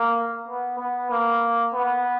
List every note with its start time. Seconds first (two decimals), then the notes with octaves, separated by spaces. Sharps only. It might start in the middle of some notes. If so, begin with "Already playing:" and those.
Already playing: A#3
0.48 B3
0.79 B3
1.11 A#3
1.74 B3